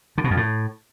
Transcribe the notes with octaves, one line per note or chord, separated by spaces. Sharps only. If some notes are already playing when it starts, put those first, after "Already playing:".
D3
B2
F2
A2